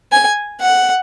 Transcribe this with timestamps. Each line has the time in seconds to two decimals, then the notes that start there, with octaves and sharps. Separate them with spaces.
0.12 G#5
0.61 F#5